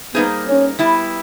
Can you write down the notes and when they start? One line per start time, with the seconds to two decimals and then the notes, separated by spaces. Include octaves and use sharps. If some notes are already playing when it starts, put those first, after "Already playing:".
0.14 G3 A#3 B3 D#4 G#4 C5
0.47 C#4
0.79 G3 B3 E4